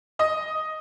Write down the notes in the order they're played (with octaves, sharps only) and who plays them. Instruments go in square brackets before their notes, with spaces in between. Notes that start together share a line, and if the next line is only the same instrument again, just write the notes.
[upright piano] D#5 D#6